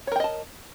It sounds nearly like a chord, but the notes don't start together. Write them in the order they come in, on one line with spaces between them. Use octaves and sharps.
C#5 A#4 G5 D#5 A5